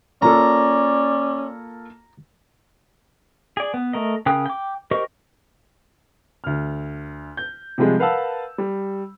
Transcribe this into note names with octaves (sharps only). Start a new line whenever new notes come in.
A#3 C#4 F4 A4 D5 A#5
G#4 D5
B3
A3 A#4 D#5
C#3 A#4 G5 D#6 F#6
G5 D6
G4 A#4 C5 D#5 C#6
D2 F6
G6
C3 F3 G3 G#3 G#4
A#4 B4 F5 F#5 A5 E6
G3